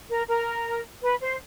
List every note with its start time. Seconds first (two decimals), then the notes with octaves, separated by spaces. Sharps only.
0.09 A#4
0.28 A#4
1.02 B4
1.21 C5